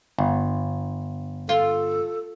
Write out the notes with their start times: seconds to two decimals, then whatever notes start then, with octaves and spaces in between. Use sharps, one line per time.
0.19 G1
1.49 F4 A4